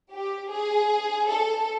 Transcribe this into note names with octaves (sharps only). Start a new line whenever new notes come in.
G4
G#4
A4